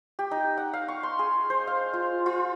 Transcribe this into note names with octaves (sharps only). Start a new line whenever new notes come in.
G4
D#4
F#5
F5
C#6
C6
G#4
C5
F5
F4
F4